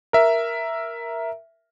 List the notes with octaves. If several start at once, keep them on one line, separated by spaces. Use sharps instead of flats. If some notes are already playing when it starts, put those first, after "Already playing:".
A#4 E5